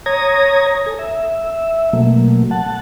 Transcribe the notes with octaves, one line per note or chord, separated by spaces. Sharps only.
C#5 A#5 D#6 G#6 A#6
A4 G#5
E5
B2 F#3 A3 A#3
F#5 A5